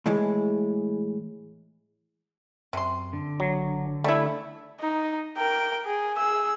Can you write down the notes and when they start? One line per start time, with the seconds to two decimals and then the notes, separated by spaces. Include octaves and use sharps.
0.06 A2 E3 G#3
2.73 F#2 C3 C6
3.13 D3
3.40 F#1 F#3
4.04 G3 A3 E4 E5
4.81 D#4
5.38 A#4 G5
5.86 G#4
6.17 G#4 E6